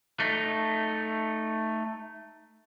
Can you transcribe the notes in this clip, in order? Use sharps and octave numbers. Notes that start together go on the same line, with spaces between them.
A3 D#4